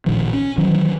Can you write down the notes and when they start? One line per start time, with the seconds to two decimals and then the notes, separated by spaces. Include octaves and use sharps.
0.06 A1 A#2 D#3 F3
0.33 C#4
0.58 D#3 E3 F#3